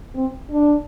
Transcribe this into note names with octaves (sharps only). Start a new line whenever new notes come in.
C4
D4